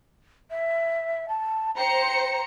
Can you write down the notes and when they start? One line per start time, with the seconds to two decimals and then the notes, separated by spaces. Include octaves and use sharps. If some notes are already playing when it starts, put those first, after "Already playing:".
0.51 E5
1.29 A5
1.77 C5 G5 A#5 C#7